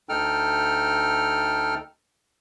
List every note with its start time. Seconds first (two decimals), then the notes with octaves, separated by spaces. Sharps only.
0.09 D2 D#4 A4 G5 F6